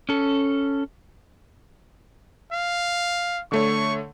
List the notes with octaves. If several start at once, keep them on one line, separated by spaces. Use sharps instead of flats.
C#4 A4
F5
D3 A3 C#5 C#6